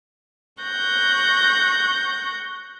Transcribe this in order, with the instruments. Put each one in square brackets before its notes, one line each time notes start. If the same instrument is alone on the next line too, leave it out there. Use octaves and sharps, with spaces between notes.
[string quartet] C#6 F#6 G6 A#6